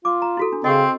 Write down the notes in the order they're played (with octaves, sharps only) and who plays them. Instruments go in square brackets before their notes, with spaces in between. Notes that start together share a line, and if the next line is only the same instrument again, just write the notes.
[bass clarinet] F4 [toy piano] D6
[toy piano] A#5
E4 F#4 A4
D4
[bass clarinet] C#3 [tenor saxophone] C4 [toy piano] D#5 G5 C#6